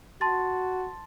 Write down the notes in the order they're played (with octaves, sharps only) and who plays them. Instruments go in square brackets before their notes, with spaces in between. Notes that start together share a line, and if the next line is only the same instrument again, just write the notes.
[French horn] F#4 [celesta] A5 C6 A6